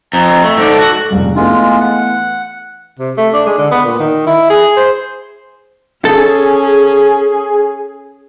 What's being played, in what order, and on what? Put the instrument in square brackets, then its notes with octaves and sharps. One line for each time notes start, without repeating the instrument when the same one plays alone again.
[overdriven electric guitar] F2 [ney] A#5
[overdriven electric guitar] A3
[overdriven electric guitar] G#2 D5 [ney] A4
[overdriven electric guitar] F#4
[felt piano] F1 C#2 G3
[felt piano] E3 A3 B3 [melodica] G#3 F4
[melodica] F#5
[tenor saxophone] C3
A3
D4
G#3
D3
B3
A#2
D#3
E4
G#4
C5
[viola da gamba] C#4 [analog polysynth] G#4 [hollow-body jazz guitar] A4